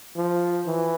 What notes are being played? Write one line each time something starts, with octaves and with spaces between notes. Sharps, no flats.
F3
E3